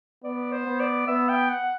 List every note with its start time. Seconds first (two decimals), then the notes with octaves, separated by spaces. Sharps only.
0.24 B3 D5
0.52 C5
0.66 B3
0.80 D5
1.07 B3 E5
1.29 G5
1.49 F#5